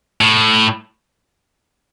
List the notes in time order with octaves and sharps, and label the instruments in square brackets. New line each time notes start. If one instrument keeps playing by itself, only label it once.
[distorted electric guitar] A2